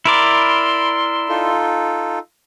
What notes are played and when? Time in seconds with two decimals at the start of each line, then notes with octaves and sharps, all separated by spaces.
0.05 E4 A#4 D5 B5 C6
1.29 D#4 F4 A4